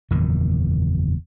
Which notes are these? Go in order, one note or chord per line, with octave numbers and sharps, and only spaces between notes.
F#1 E2 A#2 D#3